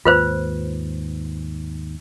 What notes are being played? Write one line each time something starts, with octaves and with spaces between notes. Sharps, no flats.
D#2 G#2 F4 B4 C5